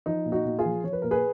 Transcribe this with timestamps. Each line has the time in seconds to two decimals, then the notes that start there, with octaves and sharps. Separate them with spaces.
0.06 F3 D#4
0.26 A#2
0.32 D#4 F#4
0.45 A#2
0.59 F4 G#4
0.65 F3
0.84 F3 C#5
0.93 B4
1.02 A#2 A#4
1.11 G#4 B4